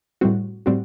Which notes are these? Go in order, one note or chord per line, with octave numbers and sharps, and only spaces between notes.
A2 G3 C4 F#4
A2 G3 C4 F#4